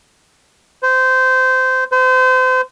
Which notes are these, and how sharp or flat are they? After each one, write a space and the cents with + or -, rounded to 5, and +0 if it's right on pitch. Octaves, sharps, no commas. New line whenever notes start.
C5 -20
C5 -35